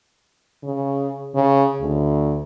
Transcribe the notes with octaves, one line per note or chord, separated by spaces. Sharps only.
C#3
C#3
D2